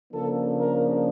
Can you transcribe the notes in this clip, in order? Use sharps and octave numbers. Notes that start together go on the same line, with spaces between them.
C#3 F3 A#3 D4 A4
A#4